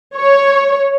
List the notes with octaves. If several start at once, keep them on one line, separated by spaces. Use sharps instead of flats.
C#5